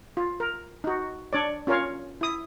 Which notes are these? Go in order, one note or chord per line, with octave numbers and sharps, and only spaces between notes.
F4
A#4
D#4 F#4
D4 C#5 D5
C#4 F4 A#4 C#5 F5
E4 D#6